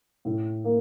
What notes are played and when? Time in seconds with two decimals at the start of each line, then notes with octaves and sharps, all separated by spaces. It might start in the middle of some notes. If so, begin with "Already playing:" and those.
0.25 A2
0.64 A#3